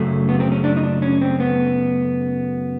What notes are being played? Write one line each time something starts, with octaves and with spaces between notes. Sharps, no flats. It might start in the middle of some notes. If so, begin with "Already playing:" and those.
Already playing: F#2 C#3 F#3 A3 C#4
B3
C4
C#4
D4
D#4
D4
C#4
C4
B3